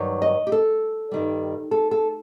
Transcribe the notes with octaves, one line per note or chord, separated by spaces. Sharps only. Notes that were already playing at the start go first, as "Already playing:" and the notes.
Already playing: G2 D#3 F#3
D#5
G4
A4
G2 D#3 G3
A4
A4